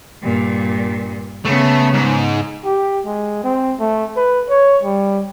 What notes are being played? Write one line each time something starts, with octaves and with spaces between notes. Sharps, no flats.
G2 A#2
C#3 A3 B3
G#2
G4
G#3
C4
A3
B4
C#5
G3